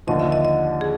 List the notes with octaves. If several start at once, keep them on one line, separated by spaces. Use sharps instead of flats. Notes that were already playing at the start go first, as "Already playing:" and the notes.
D#2 D3 F3 D#5
E5
D#5
D#5
G#4